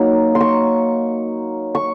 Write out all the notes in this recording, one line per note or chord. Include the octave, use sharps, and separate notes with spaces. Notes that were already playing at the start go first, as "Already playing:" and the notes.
Already playing: F#3 A#3 D#4
C6
C#6
C#6